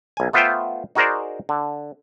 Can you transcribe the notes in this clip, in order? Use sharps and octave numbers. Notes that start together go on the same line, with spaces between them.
B1 G#5
A3 B3 F4 C5 E5 G5
D#4 F#4 G#4 A#4 C5 D5
D3